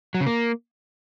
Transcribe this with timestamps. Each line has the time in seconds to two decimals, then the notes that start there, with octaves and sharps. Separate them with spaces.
0.14 F#3
0.20 C#3
0.26 A#3